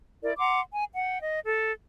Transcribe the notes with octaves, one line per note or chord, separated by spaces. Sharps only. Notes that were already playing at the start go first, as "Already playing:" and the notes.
E4 A#4 D5
F#5 A#5 C6 D6
G#5
F#5 G5
D#5
A4